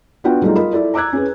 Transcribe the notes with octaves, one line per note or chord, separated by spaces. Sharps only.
B3 D4 F4 F#4 G5
F#3 G3 A3 D#4 F4 G#4
F4 A#4 D#5 B5
E4 A4 D5
A#5 D6 E6 F#6 G#6
C#4 G#4 B4